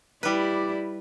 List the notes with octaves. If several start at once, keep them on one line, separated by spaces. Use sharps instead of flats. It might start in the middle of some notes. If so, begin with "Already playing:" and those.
G3 E4 G4 B4 D5